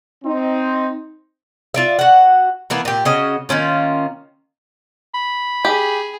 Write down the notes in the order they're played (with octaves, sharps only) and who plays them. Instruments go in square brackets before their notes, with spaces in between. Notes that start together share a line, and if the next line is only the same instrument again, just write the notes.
[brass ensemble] C4 D#4
[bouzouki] F4 D5 E5
F#4 F#5
E3 A#3 B3 E4
A#2 G4
C#3 C#4 F#4 D#5
D#3 A#3 C#4 F4
[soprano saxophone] B5
[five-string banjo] G4 [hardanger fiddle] G#4